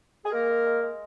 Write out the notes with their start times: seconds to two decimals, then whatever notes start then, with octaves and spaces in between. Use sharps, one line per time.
0.25 G#4
0.32 G#3 A#3 A#4
0.49 G#3
0.65 G#3
0.81 G#3